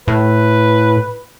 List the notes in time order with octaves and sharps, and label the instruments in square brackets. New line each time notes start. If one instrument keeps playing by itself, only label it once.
[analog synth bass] A2 [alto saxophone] B4